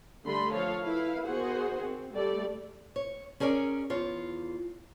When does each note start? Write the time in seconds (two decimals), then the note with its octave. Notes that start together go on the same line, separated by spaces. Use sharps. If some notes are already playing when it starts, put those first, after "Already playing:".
0.24 D3 G3 A3 A4 B5 C6
0.53 F3 A4 C#5 F5
0.83 E4 B4 F5
1.27 D#3 B3 F#4 G#4 C5 F#5
1.80 C4
2.13 G3 A3 G4 A4 D5
2.96 C#5
3.40 C#4 G#4 A#4 C#5 D5
3.90 E2 F4 C#5